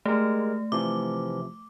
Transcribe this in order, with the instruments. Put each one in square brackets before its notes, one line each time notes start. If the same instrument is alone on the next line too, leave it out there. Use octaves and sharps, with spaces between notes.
[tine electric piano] G#3 G4 A#4 [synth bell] A3
[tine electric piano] C3 E3 F3 [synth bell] D6